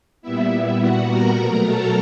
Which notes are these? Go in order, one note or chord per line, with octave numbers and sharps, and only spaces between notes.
A#2 G3 B3 E4 E5
A#2 G3 B3 F#4 F#5
A#4 A#5
B2 F#3 A3 A#4 A#5
A4 A5